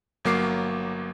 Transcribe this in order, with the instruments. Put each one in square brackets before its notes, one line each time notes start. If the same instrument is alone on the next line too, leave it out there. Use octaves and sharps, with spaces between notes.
[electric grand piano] G1 F#3 A#3 D6 C7